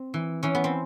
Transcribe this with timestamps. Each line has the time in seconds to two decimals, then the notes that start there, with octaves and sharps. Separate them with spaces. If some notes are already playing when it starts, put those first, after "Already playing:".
Already playing: C4
0.14 E3
0.43 E3 C#4
0.55 B3
0.64 C4